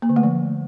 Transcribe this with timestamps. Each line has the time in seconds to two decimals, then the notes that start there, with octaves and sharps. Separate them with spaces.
0.02 A#3
0.09 D3
0.16 A3
0.23 F3